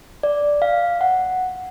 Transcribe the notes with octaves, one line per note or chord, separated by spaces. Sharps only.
D5
F5
F#5